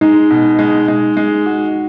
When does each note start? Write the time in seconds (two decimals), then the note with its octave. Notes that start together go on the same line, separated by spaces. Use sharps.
0.01 G#3 D#4
0.30 B2
0.59 G#3
0.88 G#3
1.17 G#3
1.46 F#4